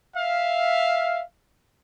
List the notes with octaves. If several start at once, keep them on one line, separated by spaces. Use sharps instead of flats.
E5 F5